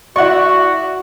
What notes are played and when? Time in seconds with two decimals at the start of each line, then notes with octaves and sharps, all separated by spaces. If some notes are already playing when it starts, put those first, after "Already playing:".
0.16 E4 F#4 D5 F#5 C#6